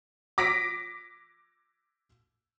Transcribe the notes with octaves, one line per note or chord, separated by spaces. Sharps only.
D6 A#6 B6 D7